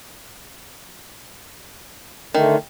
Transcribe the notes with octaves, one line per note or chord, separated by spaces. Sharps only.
D3 D#3 A3